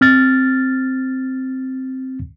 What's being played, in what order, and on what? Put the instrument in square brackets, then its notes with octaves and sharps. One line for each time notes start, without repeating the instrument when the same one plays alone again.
[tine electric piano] C4 F6 A6